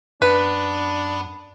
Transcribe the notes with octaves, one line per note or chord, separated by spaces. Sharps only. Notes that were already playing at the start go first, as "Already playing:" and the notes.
F#2 D4 B4 F#5 B5